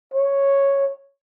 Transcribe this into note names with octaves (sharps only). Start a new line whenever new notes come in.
C#5